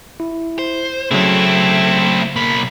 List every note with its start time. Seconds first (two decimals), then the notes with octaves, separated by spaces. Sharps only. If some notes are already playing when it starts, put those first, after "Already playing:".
0.20 E4
0.59 C5
1.11 C#3 F#3 A3 C4 E4
2.36 B1 F#3 A#3 B5